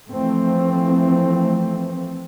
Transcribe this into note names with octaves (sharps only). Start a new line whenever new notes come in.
E3 F3 A3 C4